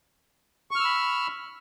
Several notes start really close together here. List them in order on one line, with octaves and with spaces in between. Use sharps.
C#6 F6 E6 B5